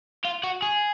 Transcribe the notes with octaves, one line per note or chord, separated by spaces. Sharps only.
F4
F#4
G#4